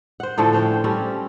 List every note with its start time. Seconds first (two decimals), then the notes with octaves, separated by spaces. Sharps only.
0.20 C5 F#5
0.38 A2 D3 F3 A3
0.53 C#4 C5 F#5 G5
0.84 G3 C4 C#4 D5